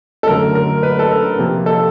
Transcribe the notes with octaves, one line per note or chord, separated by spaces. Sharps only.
A4
F#2 D3 F#3 A3 A#4
A#4
B4
A4
A#4
C3 F3 A#3
A4